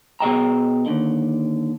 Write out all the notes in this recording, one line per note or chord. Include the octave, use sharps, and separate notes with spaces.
B2 G#4 D#5 G5 A#5
D#2 D3